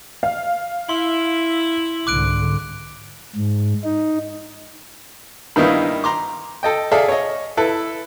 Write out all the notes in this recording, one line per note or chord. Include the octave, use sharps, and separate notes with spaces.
F5
E4 C6
C2 G#2 D3 D6 F#6 D7
G#2
D#4
G2 D#3 A#3 B3 D#4 E4
A#5 C6 D6
A4 D#5 G5
G#4 A4 D5 E5 F5
C#5 D#5
E4 A4 B4